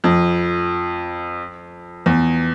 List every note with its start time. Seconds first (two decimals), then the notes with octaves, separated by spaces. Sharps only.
0.04 F2
2.06 E2